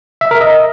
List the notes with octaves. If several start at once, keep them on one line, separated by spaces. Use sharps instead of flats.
E5
A#4
D#5